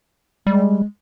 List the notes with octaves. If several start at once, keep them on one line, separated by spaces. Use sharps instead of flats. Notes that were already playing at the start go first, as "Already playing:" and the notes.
G3 G#3